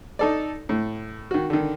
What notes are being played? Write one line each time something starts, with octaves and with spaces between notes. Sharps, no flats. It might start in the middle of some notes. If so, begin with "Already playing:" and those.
D#4 A4 D5
A2
D#3 F#4
D3 D#3